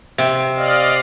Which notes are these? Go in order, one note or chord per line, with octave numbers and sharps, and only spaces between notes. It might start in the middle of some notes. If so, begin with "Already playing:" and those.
C3
D5 D#5 F5